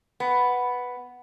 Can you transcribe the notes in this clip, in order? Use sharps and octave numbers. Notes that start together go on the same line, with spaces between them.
B3